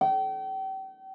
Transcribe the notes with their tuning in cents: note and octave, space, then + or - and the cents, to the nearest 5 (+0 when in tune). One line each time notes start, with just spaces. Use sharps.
G5 -35